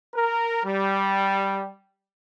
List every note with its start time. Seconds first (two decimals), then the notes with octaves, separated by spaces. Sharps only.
0.14 A#4
0.64 G3